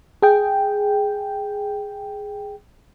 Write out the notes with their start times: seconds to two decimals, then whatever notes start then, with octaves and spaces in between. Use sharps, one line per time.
0.22 G#4 G5